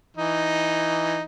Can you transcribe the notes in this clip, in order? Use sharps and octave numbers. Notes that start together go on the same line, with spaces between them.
E3 D#4